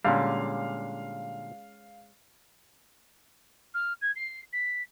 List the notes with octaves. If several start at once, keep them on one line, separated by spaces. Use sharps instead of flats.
A#2 D3 G3 G#3 C#4 F5
F6
G#6
C7
B6